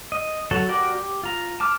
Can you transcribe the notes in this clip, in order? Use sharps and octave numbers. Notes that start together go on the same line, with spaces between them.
D#5
F#3 F#4 A4 A5
F#4 G4 A#4 D5
G4
F4 A#5
A5 D6 F6